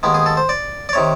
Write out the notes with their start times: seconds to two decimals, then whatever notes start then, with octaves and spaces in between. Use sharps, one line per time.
0.03 D#2 D#3 G#3 B3
0.14 G#4
0.26 A4
0.37 C5
0.49 D5
0.89 D5
0.93 C3 D#3 C#5